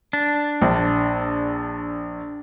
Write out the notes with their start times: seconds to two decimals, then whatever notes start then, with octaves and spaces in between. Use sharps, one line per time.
0.13 D4
0.61 A#1